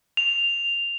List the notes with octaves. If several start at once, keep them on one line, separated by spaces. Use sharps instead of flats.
F7